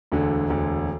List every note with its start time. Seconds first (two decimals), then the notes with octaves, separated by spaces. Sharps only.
0.12 E1 D2 D3
0.50 E1 D2 D3